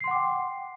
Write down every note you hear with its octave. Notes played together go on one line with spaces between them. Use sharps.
F#5 G5 C6 D6 C7